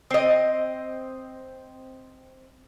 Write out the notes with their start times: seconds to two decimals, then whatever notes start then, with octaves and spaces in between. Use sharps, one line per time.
0.11 C4 D#5